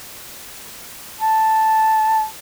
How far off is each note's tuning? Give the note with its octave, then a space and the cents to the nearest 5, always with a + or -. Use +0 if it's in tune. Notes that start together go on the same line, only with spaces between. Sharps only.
A5 +0